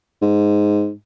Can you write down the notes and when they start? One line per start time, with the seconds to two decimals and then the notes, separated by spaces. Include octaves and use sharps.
0.22 G#2